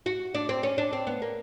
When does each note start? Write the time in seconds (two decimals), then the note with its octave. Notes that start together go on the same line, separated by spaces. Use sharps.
0.06 F#4
0.35 D4
0.49 C4
0.63 C#4
0.78 D4
0.93 C4
1.07 B3
1.22 A#3